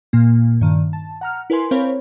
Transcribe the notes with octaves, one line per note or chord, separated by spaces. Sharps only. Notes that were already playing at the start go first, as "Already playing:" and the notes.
A#2 A#3
G2 D#3
A5
F#5 A#5 F6
E4 A#4 B4 G#5 C6
C4 A#4 C5 C#5 F5 B5